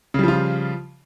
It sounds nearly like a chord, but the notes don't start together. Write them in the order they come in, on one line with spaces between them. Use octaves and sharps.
C#3 G3 F3 F4